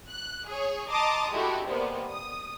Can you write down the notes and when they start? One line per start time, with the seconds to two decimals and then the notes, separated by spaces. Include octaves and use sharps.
0.11 F#6
0.48 G#4 C#5
0.90 D#5 A5 A#5 C6 D6 D#6
1.32 G#3 A3 E4 F#4 G4
1.65 C3 G3 G#3 A#3 B3
2.11 D#6